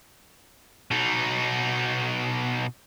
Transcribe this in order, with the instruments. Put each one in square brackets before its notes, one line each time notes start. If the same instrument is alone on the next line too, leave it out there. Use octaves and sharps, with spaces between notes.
[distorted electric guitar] B2 D#4